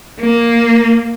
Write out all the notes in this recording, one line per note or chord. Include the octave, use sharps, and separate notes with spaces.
A#3